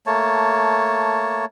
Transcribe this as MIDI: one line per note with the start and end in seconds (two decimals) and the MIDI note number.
0.07 1.45 57
0.07 1.45 58
0.07 1.45 73
0.07 1.45 81